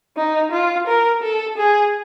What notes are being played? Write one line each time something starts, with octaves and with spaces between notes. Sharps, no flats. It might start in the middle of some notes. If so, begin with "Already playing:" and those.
D#4
F4
A#4
A4
G#4